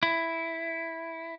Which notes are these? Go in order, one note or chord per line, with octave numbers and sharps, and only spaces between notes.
E4